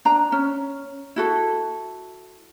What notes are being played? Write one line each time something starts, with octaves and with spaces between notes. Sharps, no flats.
D4 A#5
C#4
E4 F#4 A4